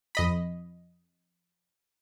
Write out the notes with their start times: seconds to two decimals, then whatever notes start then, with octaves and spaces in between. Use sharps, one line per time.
0.15 F2 D#5 B5